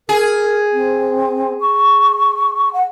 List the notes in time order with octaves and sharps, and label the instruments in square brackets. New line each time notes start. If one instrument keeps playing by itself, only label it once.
[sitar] G#4 [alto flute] A#4
[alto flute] C4
C#6
F#5